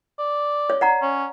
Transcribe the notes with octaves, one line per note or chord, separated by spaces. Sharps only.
D5
C#5
D5 F#5 A#5
C#4